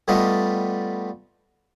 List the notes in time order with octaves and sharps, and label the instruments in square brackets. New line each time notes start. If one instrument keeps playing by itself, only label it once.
[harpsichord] G3 A3 B3 D4 F4 D#5